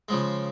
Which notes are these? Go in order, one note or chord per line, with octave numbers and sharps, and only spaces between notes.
C#3 F3 G#3